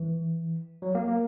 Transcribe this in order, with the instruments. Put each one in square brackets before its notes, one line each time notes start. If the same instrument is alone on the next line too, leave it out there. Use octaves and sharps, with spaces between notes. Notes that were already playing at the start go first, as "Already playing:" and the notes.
Already playing: [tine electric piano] E3
F#3
A#3
A#3